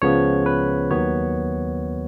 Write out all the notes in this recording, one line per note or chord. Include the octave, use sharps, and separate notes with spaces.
C#2 C#3 F3 B3 C#5
B4
D#2 D#3 F#3 B3 C#5